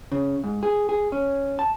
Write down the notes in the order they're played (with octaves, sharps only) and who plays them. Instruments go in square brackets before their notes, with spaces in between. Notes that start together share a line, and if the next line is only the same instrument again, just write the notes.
[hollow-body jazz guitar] C#3
G#2
G#4
G#4
C#4
A5